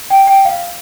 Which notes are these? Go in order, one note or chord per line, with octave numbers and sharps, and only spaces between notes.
G5
G5
F5